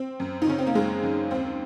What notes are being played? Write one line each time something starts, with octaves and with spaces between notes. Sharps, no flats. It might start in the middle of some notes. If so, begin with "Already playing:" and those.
Already playing: C4
F#2
D#4
C#3 C#4
C4
A#3
F#2 G#3
F#2
D#2 C4